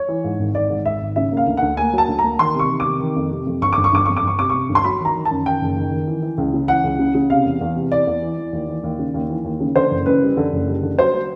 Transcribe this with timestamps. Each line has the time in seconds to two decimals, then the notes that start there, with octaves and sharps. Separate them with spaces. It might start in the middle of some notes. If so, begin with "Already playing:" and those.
Already playing: C#5
0.08 E3
0.24 G#2
0.39 G#1
0.55 G#1 D5
0.70 G#2
0.85 G#1 E5
1.01 G#1
1.16 C#3 E5
1.32 A#3
1.37 F5
1.47 D2
1.57 D2 F#5
1.77 A#3 G#5
1.93 F#3
1.98 A5
2.08 D2
2.19 A#3 A#5
2.39 D#3 C6
2.54 C3
2.59 C#6
2.69 D#3
2.80 D6
2.85 C3
3.00 D#3
3.16 F2
3.31 C3
3.46 F2
3.62 G1 C#6
3.73 G1 D6
3.84 C#6
3.92 G1 D6
4.06 F2 C#6
4.17 D6
4.23 G1 C#6
4.38 C3 D6
4.49 C3 C#6
4.69 G1
4.75 C6
4.84 F#3 B5
5.00 D#3
5.05 A#5
5.15 D#3
5.25 A5
5.31 F#2
5.46 D#3 G5
5.61 F#1
5.76 D#3
5.92 D#3
6.07 E3
6.22 E3
6.38 C#2
6.54 C#3
6.68 E3 F#5
6.84 C#2
6.99 C#3
7.15 C#3
7.30 C3 F5
7.45 E2
7.61 E2
7.76 C3
7.91 E3 D5
8.07 E2
8.22 E3
8.37 E3
8.53 D#2
8.69 E3
8.83 D#2
8.99 C#3
9.14 D#2
9.29 E3
9.45 D#2
9.60 C#3
9.75 D3 C5
9.91 F#1
10.06 F#2 B4
10.22 G3
10.37 D3
10.52 F#1
10.67 G3
10.83 D3
10.99 F#3 C5
11.14 F#3